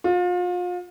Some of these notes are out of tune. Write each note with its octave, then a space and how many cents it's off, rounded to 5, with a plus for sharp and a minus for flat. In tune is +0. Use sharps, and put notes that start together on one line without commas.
F4 +35